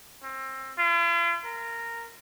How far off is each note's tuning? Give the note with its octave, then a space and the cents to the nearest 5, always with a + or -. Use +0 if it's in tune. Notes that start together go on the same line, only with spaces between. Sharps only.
C4 +25
F4 -45
A#4 -10